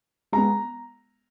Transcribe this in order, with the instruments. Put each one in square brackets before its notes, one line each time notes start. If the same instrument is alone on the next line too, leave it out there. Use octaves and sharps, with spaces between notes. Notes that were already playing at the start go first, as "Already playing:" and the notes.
[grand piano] G#3 B3 A#5